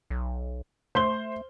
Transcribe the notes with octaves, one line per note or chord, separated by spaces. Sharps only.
B1
A3 C5 C6 G7